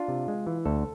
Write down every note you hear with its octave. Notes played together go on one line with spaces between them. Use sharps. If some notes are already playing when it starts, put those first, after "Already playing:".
Already playing: D4 F4
C3
G#3
E3
D2 A4